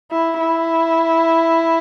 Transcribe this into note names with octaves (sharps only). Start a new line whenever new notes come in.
E4
E4